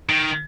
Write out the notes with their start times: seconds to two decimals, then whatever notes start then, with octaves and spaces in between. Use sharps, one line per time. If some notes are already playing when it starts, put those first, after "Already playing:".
0.09 D#3